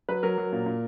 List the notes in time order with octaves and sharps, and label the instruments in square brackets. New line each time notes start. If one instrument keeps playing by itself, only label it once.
[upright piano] F#3 B4
F#3 A#4
F#3
A#2
A#2